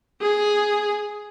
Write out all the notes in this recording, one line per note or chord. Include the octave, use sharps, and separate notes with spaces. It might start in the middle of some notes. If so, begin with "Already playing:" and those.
G#4